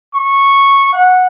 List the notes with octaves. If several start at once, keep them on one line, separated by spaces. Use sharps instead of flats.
C#6
F#5